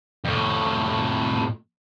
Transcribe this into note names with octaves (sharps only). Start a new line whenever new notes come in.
F2 A2